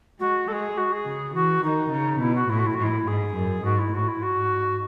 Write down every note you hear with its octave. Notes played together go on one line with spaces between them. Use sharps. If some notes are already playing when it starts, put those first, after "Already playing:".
G#3 F#4
G#3 G#4 A4
F#4
G#4
C#3
E3 F#4
D#3 D#4
C#3
B2 E4
F#4
A2 E4
F#4
E4
F#4
A2
E4
G#2 G#4
F#2
G#2 F#4
E4
A2 F#4
E4
G#2 F#4